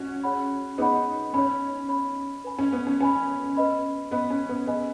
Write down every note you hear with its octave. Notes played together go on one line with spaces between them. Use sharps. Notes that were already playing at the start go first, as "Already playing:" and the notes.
Already playing: C#4 F#4
G#4 C#5 F#5 B5
B3 D#4 G#4 C#5 F#5 B5
C#4 C#5 B5
C#5 B5
B4 G#5 B5
C#4
B3
C#4
C#4 B4 G#5 B5
B4 D#5 B5
B3 B4 D#5 B5
C#4
B3
B3 G#4 D#5 G#5 B5